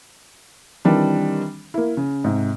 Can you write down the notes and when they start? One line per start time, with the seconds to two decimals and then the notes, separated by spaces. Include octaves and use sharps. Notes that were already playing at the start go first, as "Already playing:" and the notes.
0.85 D#3 E3 G3 C4 D4
1.74 A#3 E4
1.97 C#3
2.24 G#2 C3